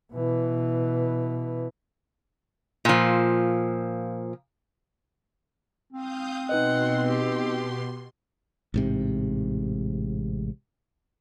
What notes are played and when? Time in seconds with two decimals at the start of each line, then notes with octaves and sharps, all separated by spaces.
0.13 B2 E3
2.85 A#2 F3
5.93 C4 F5 D#6 G6
6.49 B2 D#4 B4 D#5 F#5 C6
7.08 G4
8.74 A1 G#2 C3